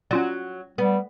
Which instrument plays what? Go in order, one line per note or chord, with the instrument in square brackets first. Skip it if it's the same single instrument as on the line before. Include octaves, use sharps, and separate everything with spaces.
[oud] F#3 [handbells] C#4 F4 D5
[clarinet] G3 [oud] B3